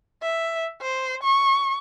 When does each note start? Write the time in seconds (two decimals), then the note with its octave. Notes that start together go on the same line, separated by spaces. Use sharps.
0.22 E5
0.82 C5
1.23 C#6